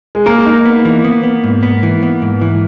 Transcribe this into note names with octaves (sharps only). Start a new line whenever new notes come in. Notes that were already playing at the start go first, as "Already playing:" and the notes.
G#3
A#3 A#4
D#4
B3
E3
B3
B3
G#2
B3
E3
B3
G#2
E3